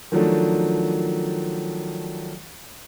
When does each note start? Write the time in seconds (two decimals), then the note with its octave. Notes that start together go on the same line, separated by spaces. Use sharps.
0.12 D#3 F3 F#3 A3 D4